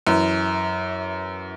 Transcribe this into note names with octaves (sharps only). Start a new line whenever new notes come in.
F#2 E3